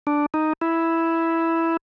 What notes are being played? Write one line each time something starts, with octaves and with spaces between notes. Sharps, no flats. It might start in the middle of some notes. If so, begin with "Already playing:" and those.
D4
D#4
E4